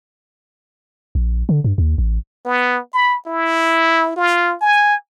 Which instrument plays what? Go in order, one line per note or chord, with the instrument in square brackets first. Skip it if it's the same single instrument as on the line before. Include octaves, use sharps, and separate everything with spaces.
[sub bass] A#1
D3
G2
D#2
A1
[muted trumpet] B3
B5
E4
F4
G#5